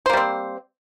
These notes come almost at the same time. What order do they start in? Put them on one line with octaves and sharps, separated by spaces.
C5 A#3 G3 C4